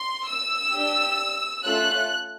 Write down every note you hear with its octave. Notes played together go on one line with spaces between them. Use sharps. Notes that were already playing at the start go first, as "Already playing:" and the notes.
Already playing: C6
E6
D4 G4
A3 C#4 F4 A4 F#6